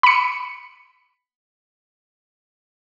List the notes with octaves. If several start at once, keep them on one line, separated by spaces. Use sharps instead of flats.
B5 C#7